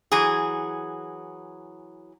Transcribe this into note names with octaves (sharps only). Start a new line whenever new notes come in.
E3 F#3 G#4